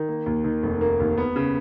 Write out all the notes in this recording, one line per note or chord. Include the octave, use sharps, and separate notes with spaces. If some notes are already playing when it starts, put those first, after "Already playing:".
Already playing: D#3
A#3
D#2
D#3
F1
A#3
D#2
B3
C#3